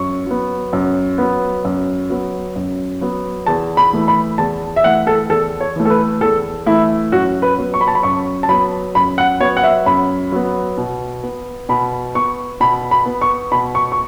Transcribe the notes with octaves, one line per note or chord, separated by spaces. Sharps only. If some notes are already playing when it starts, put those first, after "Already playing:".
Already playing: F#2 C#6
F#3 B3
F#2
F#3 B3
F#2
F#3 B3
F#2
F#3 B3
E2 A5
B5
E3 A3
B5
E2 A5
E5
E3 A3 F#5
A4
E2 A4
C#5
E3 A3
A4
B4
E2 A4
E3 A3 E4
F#2 F#4
B4
F#3 B3
C#6
B5
A5
B5
F#2 C#6
A5
F#3 B3 B5
F#2 B5
F#5
F#3 B3 C#5
F#5
E5
F#2 B5
F#3 B3
B2
B3
B2 B5
B3 C#6
B2 B5
B5
B3
C#6
B2 B5
C#6
C#6